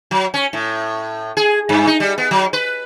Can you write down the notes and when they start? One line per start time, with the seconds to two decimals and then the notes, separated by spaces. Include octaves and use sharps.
0.11 F#3
0.34 C#4
0.53 A2
1.37 G#4
1.69 G2
1.87 D#4
2.00 G3
2.18 B3
2.31 F#3
2.53 B4